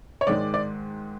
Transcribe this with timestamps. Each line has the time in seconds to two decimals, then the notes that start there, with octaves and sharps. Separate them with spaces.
0.21 C#5
0.27 G#2 D#3 G#3 D5
0.54 D5